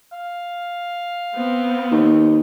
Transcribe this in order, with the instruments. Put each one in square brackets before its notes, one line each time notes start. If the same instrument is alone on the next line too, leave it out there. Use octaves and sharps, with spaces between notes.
[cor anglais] F5
[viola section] B3 C4
[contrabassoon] D#2